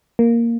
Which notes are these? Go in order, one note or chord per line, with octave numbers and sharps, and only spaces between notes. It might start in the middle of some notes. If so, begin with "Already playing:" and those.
A#3